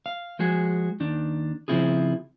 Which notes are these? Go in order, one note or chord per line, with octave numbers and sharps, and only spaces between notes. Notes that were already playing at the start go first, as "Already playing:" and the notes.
F5
F3 G#3 F#4 G#4
D#2 D#3 D4
C#3 F3 C4 E4 F4 G#4